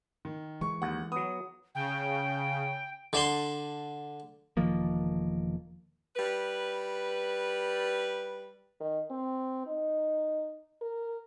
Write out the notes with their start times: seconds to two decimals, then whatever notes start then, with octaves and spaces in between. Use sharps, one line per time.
0.25 D#3
0.61 E3 G#3 C#6
0.82 D#2 F#5
1.12 F#3 B3 D#6
1.75 C#3 G5
3.13 D3 D5 A5 C6
4.57 E1 D#3 F3 A#3
6.16 G3 B4
8.80 D#3
9.10 C4
9.67 D#4
10.82 A#4